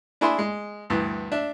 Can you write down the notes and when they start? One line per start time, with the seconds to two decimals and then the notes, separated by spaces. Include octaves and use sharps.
0.21 D4 E4 G#4 E5 B5 C6
0.39 G#3
0.90 D2 G2 E3
1.32 D4 E5